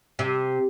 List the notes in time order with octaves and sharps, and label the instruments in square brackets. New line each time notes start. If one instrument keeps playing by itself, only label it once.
[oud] C3